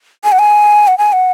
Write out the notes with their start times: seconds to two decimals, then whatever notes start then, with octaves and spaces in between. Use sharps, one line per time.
0.24 G#5
0.32 F#5
0.39 G#5
0.88 F#5
0.98 G#5
1.13 F#5